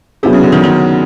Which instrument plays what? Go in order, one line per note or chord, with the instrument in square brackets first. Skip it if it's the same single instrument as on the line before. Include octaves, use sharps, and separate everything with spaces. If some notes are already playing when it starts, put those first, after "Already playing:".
[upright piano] C3 [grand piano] F#3 B3 E4 G#4
[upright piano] C#3
D3
D#3
D#3